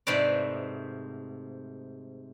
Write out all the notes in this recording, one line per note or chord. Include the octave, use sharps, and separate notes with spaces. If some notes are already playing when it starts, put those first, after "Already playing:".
G#2 C3 A3 B4 D5